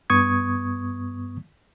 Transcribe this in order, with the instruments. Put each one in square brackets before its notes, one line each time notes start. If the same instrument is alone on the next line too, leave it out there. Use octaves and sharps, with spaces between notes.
[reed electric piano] G2 B3 C#6 D#6 G#6